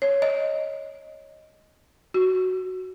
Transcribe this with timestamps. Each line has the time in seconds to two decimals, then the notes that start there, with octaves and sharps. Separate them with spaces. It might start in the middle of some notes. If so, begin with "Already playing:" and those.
0.02 C#5
0.22 D#5
2.14 F#4